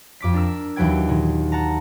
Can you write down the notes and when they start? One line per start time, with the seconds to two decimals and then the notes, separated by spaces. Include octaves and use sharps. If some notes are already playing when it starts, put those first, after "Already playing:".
0.20 F2 D6 B6
0.34 D4 A#4 E6
0.76 D#2 E3 F#3 B4 G5 G#6
1.09 A#2 D#3
1.52 F#5 A5 A#5